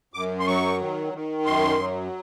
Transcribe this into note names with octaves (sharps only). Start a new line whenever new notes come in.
F#2 D6
C6
F#3 C#6
D#3
D#3
F#2 C6
F#3